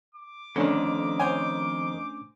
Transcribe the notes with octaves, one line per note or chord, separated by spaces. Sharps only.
D6
F2 D3 D#3 A3 C#4 D4
C5 C#5 G#5